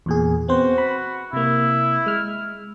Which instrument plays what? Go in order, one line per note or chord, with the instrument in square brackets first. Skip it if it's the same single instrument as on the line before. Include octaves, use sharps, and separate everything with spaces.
[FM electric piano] E2 A#2 G#4
[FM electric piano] B3 C4 C5 [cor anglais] F#4
[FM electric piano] B5
[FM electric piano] C3 A#3 [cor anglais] E4
[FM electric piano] G#3 F6